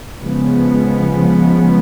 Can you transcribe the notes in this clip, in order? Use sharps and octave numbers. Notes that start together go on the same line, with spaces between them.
C#3 F3 G#3 B3